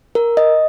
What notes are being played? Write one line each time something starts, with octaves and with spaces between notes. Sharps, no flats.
A#4
D#5